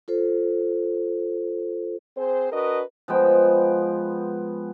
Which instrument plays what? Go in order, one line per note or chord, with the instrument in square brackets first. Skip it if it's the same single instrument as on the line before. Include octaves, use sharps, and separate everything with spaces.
[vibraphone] F4 A4 C5
[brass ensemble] C4 G#4 C5
D4 F#4 A#4 B4 D#5
[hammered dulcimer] F3 G#3 B3 G5